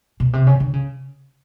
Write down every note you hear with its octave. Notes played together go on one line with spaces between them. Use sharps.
B2
C3
C#3
D3
C#3